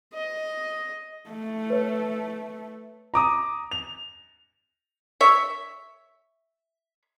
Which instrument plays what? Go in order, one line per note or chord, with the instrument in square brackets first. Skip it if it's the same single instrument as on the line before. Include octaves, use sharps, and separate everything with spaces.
[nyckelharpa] D#5
[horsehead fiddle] A3
[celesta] B4 C#5
[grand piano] A#5 D6 D#6
F7
[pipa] C#5 E5